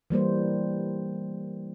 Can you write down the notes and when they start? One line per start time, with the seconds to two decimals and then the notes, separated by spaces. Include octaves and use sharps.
0.10 E3 G3 A#3 C5